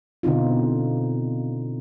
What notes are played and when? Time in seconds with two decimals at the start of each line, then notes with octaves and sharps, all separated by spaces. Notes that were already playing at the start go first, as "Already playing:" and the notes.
0.23 B2 D3 C4 D#4 F4